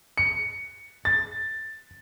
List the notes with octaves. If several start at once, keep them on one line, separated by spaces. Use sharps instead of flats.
C#7
A6